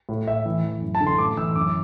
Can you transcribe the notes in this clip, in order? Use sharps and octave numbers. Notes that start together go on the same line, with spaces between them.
A2
A2 E5
E3
E3
F#2
A5
D3
C6
A2 D6
E3 E6
F#2 D6